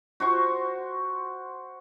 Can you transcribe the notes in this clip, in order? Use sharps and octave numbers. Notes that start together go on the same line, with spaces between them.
F#4 C5 C#6